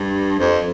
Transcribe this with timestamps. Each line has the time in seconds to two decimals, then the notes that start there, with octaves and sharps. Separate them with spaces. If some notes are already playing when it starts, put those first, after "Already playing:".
Already playing: G2
0.38 F2